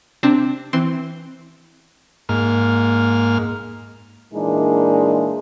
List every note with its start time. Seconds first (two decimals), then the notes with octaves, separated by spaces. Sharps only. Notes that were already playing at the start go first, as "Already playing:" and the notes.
0.23 C3 C4 D4
0.73 E3 C4 C6
2.29 G#2 A#3 F6
4.33 A#2 E3 G#3 D4 D#4